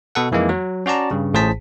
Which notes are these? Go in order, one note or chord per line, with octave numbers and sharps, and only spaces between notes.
B2 A4 F#5
F2 E3 G#3 A#3 D#4
F#3
C#4 F#4 D5 A5 A#5
G2 C#3
A1 A2 G#4 C5 A5 B6